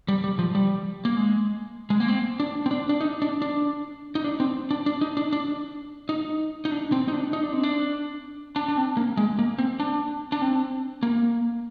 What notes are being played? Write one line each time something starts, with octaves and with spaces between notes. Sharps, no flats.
G3
G3
F3
G3
A#3
G#3
G#3
A#3
C4
D4
C4
D4
D4
D#4
D4
D4
D#4
D4
C4
D4
D4
D#4
D4
D4
D#4
D#4
D4
C4
D#4
D4
D#4
D4
C4
D4
D4
D4
C4
A#3
G#3
A#3
C4
D4
D4
C4
A#3